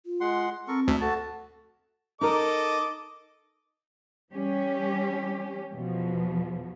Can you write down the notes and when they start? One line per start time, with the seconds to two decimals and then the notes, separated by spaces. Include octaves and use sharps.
0.06 F4
0.21 G#3 F#5 C6
0.68 C4 A4 A#4 C#6
0.88 D2 D4 E5
1.01 F#4 A4 A5
2.21 D#4 A4 A#4 D#5 D6
4.32 E3 G3 C#4 G4
5.72 E2 B2 F3